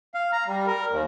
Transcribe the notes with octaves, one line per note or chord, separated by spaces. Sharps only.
F5
A#5
G3
A#4
D#2